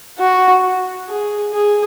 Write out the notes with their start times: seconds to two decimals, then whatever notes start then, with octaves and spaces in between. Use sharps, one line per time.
0.19 F#4
1.09 G#4
1.53 G#4